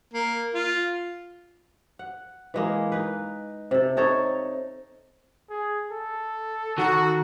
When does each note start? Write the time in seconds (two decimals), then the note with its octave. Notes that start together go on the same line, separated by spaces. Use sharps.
0.14 A#3
0.55 F4
1.99 F#5
2.54 E3 G#3 A#3
2.92 D#4 B4
3.71 C3 A4
3.97 C3 D#4 A4 C#5
5.50 G#4
5.91 A4
6.78 D#3 F#4